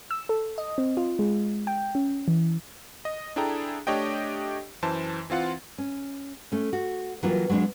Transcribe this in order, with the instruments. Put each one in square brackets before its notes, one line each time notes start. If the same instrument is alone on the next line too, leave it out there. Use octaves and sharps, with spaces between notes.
[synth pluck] E6
A4
D#5
C4
F4
G#3
G5
C#4
E3
[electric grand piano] D#5
D4 E4 G#4 A4 G5 A#5
A3 D4 G4 C#5 D#5 G5
F#2 E3 C5 A5
E3 C4 F4 F#5
[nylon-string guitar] C#4
A3 C#4
F#4
E3 F#3 G3 A#3 B3 F4
F#3 G#3 B3 D4